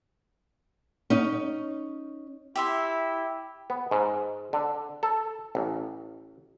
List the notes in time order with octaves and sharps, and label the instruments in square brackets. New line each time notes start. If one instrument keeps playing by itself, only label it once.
[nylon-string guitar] C#4 D#4
[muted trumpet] E4 [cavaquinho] G4 E5 C6
[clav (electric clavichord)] B3
G#2
D3
A4
A1